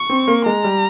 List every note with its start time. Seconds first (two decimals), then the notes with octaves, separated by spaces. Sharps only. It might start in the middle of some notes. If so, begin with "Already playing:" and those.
Already playing: C#6
0.10 C4
0.28 A#3
0.46 G#3 A#5
0.64 G3